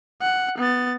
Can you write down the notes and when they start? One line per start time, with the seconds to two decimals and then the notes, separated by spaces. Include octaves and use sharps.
0.22 F#5
0.58 B3 A6